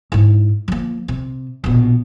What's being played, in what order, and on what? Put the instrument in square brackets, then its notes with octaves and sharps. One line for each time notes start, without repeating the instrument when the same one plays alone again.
[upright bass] G#2 E4
F3 A#3
C3
A#1 B2